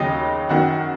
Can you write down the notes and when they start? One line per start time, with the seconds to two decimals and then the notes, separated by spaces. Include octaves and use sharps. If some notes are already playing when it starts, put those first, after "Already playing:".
Already playing: D#2 C#3 F#3 D#5
0.49 F#2 D#3 F#3 F#4 F#5